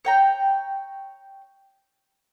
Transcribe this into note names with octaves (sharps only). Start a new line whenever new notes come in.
C#5 G5 A#5